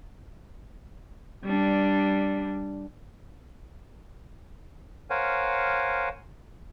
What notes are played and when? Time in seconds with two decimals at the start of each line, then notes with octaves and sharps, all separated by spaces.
1.44 G3 D4
5.10 A#4 C5 C#5 F5 F#5 G#5